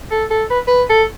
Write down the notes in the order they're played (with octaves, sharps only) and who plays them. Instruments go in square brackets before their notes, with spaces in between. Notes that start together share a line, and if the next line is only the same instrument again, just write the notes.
[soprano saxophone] A4
A4
B4
B4
A4